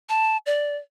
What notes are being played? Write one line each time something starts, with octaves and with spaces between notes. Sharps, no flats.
A5
D5